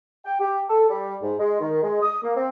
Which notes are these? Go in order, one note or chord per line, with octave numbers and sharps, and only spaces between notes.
G5
G4
A4
G3
G#2
G#3
D#3
G#3
D#6
A#3
C4